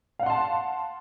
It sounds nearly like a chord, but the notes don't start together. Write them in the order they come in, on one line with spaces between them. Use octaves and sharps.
F5 F#5 C6 A5